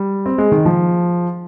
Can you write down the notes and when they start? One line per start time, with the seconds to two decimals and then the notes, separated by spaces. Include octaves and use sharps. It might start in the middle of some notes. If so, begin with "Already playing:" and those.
Already playing: G3
0.26 C4
0.38 G#3
0.52 D#3
0.65 F3